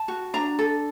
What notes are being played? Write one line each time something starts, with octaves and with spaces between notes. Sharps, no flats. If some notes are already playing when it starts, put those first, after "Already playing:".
Already playing: A5
F#4
D4 A#5
A4